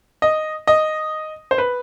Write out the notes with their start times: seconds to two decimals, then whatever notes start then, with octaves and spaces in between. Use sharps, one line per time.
0.22 D#5
0.67 D#5
1.51 C5
1.58 B4